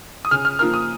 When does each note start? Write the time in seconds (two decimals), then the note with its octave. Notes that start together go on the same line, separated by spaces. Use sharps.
0.25 D#6
0.31 C#3 F6
0.45 F6
0.59 F3 A#3 F4 A#4 F6
0.74 D#6